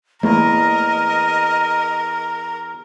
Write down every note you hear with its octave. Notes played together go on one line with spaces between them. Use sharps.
E2 A3 A#3 A#4 D#5